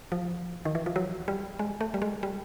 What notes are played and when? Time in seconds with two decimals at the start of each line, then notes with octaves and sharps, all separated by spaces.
0.12 F3
0.65 D#3
0.75 E3
0.86 F3
0.96 F#3
1.28 G3
1.59 G#3
1.81 A3
1.94 G3
2.02 G#3
2.23 G3